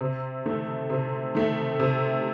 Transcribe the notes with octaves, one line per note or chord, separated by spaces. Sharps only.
C3
D#3 A3
C3
D#3 A3
C3